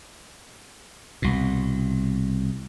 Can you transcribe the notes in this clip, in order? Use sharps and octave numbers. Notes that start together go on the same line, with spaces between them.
C2 B2